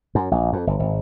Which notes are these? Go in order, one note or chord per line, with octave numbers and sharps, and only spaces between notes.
F#2
A#1
F2
G1
G#1